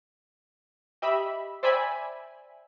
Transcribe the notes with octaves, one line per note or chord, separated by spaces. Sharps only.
G4 D#5 E5 B5
C5 D5 E5 G5 G#5 B5